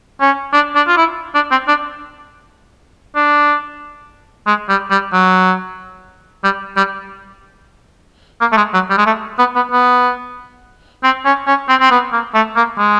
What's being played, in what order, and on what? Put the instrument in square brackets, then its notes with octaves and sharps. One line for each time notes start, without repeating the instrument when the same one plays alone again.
[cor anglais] C#4
D4
D4
F4
E4
D4
C4
D4
D4
G#3
G3
G3
F#3
G3
G3
A#3
A3
G#3
F#3
G3
G#3
A3
B3
B3
B3
C4
C#4
C#4
C4
C4
B3
A#3
A3
A#3
G#3